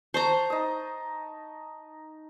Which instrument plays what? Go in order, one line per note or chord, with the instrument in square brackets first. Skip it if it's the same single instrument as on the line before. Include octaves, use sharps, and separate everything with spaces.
[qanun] C5 A#5 [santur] A5 C#6 D#6
[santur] D#4 D#6